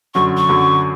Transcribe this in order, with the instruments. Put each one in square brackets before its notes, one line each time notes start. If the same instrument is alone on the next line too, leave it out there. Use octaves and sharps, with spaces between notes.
[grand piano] F#2 D3 F#3 [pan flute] C#6
[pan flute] C#6
[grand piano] F#2 D3 F#3